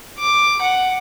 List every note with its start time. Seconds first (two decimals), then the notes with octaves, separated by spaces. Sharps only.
0.19 D6
0.61 F#5